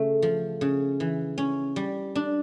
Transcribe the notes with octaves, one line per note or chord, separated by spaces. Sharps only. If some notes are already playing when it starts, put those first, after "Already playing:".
Already playing: C#3 A3
F3
C#3
E3
C#4
G3
D4